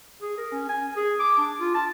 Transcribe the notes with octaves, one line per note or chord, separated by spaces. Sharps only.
G#4
A#4
C#4
G#5
G#4
D6
D4
F4
A5